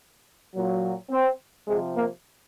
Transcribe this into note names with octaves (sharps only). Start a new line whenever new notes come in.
A#2 F#3
C4
C3 F3 G#3
A#3